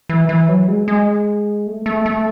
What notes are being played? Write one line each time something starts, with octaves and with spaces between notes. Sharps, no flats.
E3
E3
F#3
G#3
G#3
A3
A3
A3